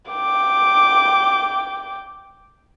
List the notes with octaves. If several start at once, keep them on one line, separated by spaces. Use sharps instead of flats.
G5 D6